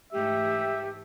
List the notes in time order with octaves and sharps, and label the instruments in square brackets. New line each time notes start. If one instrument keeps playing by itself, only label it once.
[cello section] G#2 E3 A3 [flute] G4 [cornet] E5